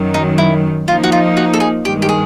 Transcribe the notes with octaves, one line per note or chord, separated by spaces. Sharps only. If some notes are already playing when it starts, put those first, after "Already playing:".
Already playing: F#2 D#3 F#3
D#4
E4
F3 A#3 D#4 F4
F#4
F4
F#4
A4
G#4
G2 D#3 G#3 G4
G4
G#4